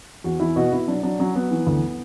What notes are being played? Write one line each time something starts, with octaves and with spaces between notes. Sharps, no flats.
E2 F#4
E2 E4
B2 F#4
B2 E4
F#3 D4
F#3 D4
F#3 C#4
F#3 B3
E3
D2